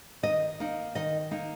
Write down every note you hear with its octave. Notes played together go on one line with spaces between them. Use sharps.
D#3 D#5
A#3 D#4
D#3 D#5
A#3 D#4